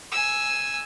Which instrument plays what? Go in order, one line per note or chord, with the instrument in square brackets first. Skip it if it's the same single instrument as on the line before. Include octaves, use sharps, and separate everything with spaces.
[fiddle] G#5 E6